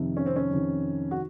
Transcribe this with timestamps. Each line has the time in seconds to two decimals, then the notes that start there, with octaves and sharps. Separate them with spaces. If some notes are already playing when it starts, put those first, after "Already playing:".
Already playing: F2 C3 D#3
0.17 C#4
0.26 C4
0.36 C#4
0.51 F2 C3 D#3
1.11 F#4